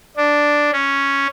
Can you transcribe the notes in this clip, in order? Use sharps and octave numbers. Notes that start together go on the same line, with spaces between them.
D4
C#4